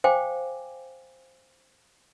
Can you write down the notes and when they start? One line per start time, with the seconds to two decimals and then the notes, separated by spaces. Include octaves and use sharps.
0.04 C5 F5 G5 G#5 D6